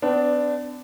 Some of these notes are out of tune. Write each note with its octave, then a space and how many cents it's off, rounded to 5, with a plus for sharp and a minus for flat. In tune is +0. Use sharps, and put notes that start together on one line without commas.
B3 +45 D4 +0